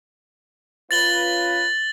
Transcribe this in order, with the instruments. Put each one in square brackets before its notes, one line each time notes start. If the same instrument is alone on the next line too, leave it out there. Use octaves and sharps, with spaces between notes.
[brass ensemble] C#4 F4 B4 [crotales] A6 F#7 G7